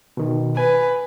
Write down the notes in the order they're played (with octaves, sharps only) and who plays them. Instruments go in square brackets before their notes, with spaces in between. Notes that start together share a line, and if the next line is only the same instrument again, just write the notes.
[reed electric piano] B2 D#3
[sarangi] B4 [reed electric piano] G#5